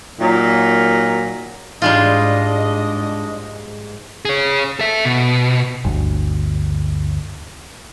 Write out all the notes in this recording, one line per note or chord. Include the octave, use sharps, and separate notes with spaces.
A#2 D#3 F#3
G#2 G3 G#3 D4 F4 D#5
G#4 C#5
A4 E5
B2
G1 D2